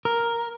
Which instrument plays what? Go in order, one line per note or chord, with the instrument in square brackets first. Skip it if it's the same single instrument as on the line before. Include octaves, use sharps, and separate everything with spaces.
[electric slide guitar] A#4